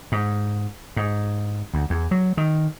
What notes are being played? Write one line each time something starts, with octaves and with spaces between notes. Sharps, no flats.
G#2
G#2
D2
E2
F#3
D#3